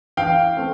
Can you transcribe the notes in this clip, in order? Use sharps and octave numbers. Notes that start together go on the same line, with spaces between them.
E3 F5 G5
A3 C4